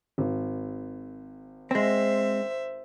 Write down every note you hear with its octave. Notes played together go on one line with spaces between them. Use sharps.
G#1
G#3 C4 C5 E5